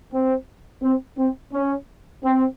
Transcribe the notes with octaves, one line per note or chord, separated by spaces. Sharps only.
C4
C4
C4
C#4
C4